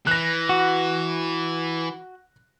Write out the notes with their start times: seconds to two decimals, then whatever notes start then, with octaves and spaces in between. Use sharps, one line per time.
0.07 E3 F#6 A#6
0.49 F#4